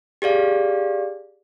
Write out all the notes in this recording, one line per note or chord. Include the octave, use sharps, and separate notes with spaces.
G4 G#4 D5 F5